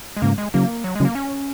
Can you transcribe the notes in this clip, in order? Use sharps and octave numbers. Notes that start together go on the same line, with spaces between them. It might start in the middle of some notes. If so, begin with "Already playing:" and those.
G#3
G#2 C#3 A#3
G#3
C#3 F#3 A#3
F#3
C#3 F#3 G#3
A#3
C#4